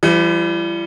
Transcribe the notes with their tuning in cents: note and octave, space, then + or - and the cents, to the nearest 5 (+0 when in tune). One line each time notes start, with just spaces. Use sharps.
E3 +45 G3 +0